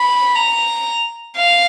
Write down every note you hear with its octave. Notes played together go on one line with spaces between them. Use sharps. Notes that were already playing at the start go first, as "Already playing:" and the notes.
Already playing: B5
A#5
F5